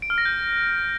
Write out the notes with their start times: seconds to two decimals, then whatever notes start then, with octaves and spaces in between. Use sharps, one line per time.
0.02 D7
0.10 F6
0.18 A#6
0.25 G6